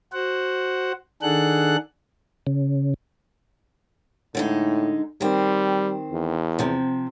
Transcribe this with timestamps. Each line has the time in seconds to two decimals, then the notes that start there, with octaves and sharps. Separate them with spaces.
0.13 F#4 C5 F#5
1.22 D#3 D4 G#4 A4 F#5 F#6
2.47 C#3
4.35 A2 D3 G#3 D#4
5.21 D#3 G3 C4
6.12 E2
6.59 C3 F3 C4